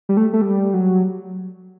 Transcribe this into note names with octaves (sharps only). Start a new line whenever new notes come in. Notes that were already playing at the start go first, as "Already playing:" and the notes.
G3
A3
A3
G3
F#3